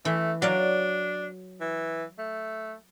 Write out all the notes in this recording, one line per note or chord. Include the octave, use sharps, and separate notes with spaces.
E3 A3
F#3 D4 D5 F5
E3
A3